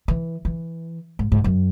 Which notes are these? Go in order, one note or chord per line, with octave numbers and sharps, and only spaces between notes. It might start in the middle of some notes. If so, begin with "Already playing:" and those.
E3
E3
G#2
G#2
F#2